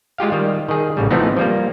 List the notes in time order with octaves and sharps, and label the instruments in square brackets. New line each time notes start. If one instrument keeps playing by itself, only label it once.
[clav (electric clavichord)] G#3 F4 G4 F5
D#3 G3
D#3 G#4
A1 C#3 G3
E3 F3 A3 B3 C4 D#4
F3 G3 A#3